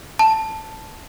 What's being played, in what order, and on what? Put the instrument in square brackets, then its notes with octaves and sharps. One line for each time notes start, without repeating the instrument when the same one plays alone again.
[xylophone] A5